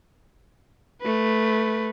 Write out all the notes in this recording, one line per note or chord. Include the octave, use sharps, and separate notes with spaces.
A3 B4